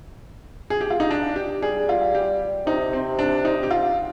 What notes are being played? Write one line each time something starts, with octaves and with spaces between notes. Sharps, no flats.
G#4
G4
F4
D#4
D4
G4
G3 G#4
F4
G4
C3 D#4
C4
D4
D#4
G4
F4